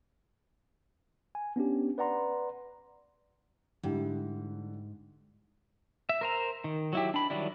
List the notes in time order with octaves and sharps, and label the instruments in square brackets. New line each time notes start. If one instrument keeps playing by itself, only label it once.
[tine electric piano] G#5
B3 C#4 D4 G4
B4 D5 F#5 A#5 C6
[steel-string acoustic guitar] G#2 [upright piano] D3 G3 E4
[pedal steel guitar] E5
A#4 C5 A#5
D#3
F#3 E4 G4
D4 B5
D#3 F#3 G3 D4 E4